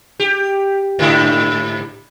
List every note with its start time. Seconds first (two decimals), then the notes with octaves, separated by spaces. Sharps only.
0.20 G4
0.99 G#2 D3 E4